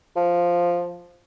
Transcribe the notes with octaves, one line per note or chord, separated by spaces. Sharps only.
F3